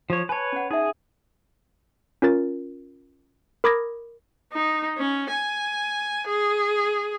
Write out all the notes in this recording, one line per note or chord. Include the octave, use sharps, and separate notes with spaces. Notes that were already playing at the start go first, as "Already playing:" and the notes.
F3 C#5
B4 C#5 G#5 A5
C#4 F#5
D#4 G#4 E5
C#4 F4 A#4 A6
A#4 B5 D6 D#6 G#6 A#6
D#4
C#4
G#5
G#4